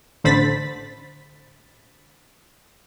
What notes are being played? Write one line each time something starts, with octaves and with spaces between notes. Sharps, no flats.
A1 D3 C5 B5 A6 B6